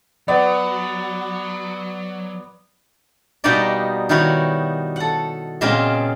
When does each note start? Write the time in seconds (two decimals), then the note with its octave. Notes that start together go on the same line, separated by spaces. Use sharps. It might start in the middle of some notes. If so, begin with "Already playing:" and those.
0.28 F#3 B3 D5
3.44 B2 G3 A#3 B3 D#4 D5
4.09 D#3 G3 E4 F#4 C#5
4.96 A4 F#5
5.61 A#2 C#3 G#3 B3 C4 F4